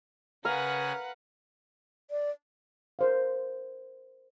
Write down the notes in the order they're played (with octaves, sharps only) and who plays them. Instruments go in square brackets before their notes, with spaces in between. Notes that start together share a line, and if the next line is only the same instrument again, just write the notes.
[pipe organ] C#3 G#5 A#6 [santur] A#4 F5 [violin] B4 F#5
[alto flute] D5
[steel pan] A#4 C5 F5